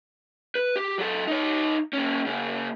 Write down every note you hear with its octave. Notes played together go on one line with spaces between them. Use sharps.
B4
G4
F#3 A4
D#4 C#5
A#3 C#4
C#3 A#3